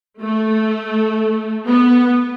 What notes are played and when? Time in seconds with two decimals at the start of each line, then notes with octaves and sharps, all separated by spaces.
0.22 A3
1.67 B3